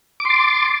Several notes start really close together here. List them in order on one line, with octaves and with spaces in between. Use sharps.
D6 C6 A6